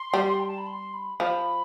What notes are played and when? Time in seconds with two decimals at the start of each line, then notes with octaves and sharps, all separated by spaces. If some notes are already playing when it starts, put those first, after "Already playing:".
Already playing: C6
0.14 G3
0.40 G5
0.48 A5
0.58 B5
0.67 C6
0.93 B5
1.19 F3 B5